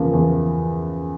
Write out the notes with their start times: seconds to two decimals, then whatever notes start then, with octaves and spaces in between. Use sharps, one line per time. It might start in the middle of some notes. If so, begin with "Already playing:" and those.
Already playing: E2 C#3 F3 A#3
0.13 E2